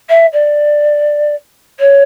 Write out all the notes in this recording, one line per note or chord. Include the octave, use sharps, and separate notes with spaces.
E5
D5
C#5